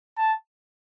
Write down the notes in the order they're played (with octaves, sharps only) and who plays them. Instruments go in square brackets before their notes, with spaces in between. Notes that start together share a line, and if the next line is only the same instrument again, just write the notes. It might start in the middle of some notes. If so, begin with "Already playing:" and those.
[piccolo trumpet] A5